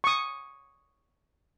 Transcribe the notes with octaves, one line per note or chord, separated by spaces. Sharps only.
C#6 D#6